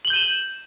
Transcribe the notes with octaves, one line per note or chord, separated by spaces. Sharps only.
G6 D#7 E7 F#7 G7